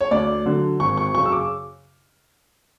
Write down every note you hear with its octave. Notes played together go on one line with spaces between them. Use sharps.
C#5
D2 D5
D3 F#3
G#1 C#6
C#6
F#2 C#3 C#6
E6
D6